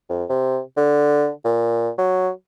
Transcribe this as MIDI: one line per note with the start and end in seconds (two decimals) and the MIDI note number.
0.10 0.24 41
0.29 0.60 48
0.77 1.30 50
1.45 1.90 46
1.98 2.30 54